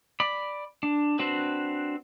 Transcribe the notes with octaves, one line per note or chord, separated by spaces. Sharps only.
D5 B5
D4
C4 D4 F#4 B4